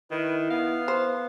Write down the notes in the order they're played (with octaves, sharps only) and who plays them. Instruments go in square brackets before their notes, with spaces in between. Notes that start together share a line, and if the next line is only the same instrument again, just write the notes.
[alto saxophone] D#3 [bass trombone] E4 [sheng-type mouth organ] B4
[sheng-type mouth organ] B3 [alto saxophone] F5
[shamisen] C5